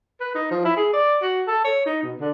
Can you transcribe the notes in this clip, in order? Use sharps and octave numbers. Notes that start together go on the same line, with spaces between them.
B4
D#4
F3
E4
G#4
D5
F#4
A4
C#5
D#4
B2
D3